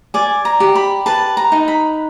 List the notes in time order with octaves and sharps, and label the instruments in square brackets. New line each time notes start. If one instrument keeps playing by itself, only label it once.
[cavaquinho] D5 G#5
A#5
G4
B5
B4 A5
A#5
D#4
B5